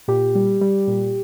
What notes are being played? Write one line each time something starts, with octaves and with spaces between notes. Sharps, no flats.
A#2 G4
G3
G3
A#2